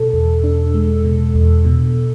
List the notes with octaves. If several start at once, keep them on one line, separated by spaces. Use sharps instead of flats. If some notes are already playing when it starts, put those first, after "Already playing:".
Already playing: B2 A4
E2
D4
G#3
B2
E2
B2